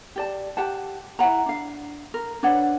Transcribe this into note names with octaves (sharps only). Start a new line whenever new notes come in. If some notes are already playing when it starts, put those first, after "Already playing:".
G4 D5 A5
G4 F#5 A5
E4 E5 F#5 A#5
D4 F5
A#4
D4 B4 C#5 F#5